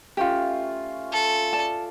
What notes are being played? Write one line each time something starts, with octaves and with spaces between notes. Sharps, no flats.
A3 C#4 F4 G4
A4
D5 A5